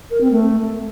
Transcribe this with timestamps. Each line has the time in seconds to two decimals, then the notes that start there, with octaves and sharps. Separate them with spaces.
0.11 A#4
0.21 C4
0.31 A3